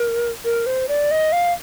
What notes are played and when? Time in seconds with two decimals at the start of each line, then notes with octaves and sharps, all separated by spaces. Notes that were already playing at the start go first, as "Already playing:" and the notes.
Already playing: A#4
0.45 A#4
0.66 C5
0.88 D5
1.11 D#5
1.32 F5